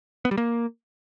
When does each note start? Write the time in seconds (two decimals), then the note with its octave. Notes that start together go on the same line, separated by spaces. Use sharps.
0.25 B3
0.31 G3
0.37 A#3